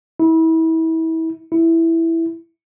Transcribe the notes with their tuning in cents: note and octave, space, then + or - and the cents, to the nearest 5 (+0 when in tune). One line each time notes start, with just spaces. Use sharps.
E4 -30
E4 +0